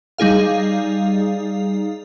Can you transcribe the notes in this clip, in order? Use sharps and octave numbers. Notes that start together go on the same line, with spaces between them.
G3 D#4 G#4 F5